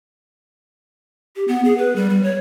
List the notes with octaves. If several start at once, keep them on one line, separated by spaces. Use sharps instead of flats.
G4
B3
G#4
B4
G3
G3
C#5